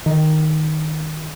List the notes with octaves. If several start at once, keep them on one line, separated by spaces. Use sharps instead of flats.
D#3